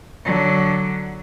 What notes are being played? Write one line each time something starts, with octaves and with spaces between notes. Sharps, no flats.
D3 F#3